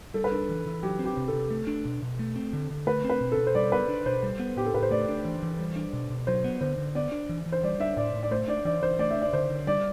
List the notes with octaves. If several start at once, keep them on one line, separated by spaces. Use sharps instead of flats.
G3 A4
B4
D4 A4
E3
E3
F#3 G4
C4
G4
C3
A4
C3
A3
D4
B2
B2
A3
C4
D3
D3
A3 B4
C4
B4
B2
A4
B2
C5
G3 D5
B3 B4
D4
B2 C5
G3
B3
A2 G4
A4
A2 B4
C5
A3 D5
D4
E3
E3
G3
D4
B2
B2
F#3 C5
B3
D3 C5
D3
B3 D5
D4
E3
E3
C5
G3 D5
D4 E5
A2 D5
A2
D5
A3 C5
D4 D5
E3 D5
E3 C5
A3 D5
E5
D4
D5
D3 C5
D3
G3 D5